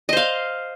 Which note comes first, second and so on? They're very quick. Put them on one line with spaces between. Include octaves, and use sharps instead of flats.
D#5 C5 F5